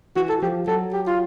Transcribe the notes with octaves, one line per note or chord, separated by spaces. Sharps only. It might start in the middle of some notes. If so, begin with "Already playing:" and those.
E3 F#4
A4
F3 G4
F#3 A4
G4
F4